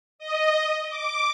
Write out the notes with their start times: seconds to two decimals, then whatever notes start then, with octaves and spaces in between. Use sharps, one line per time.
0.19 D#5
0.89 D6